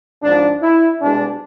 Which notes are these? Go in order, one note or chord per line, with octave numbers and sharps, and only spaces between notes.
G#1 G#2 F3 D4
E4
C2 B2 G#3 D4